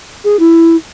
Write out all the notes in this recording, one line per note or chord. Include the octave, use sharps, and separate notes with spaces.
G#4
E4